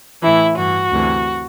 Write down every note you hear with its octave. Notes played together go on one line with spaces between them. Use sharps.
A2 E3 E4
G2 E3 F#4
D2 C3 E3